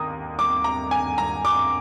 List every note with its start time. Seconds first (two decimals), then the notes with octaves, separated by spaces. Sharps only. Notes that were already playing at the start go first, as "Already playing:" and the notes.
Already playing: D#2 A#5 D#6
0.39 D6
0.64 A#5
0.91 G#5
1.18 A#5
1.45 D6